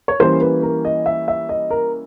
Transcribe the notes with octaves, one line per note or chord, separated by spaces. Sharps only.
C#5
E3 G3 A#3 C#4 C5
B4
A#4
D#5
E5
E5
D#5
A#4